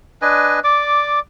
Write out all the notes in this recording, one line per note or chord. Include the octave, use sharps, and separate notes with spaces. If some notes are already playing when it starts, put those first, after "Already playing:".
D4 B4 D#5 G#5
D5 D6